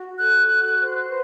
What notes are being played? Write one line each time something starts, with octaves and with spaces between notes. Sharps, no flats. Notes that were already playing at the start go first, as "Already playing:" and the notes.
Already playing: F#4
A4 F#6
F#4
C5
B4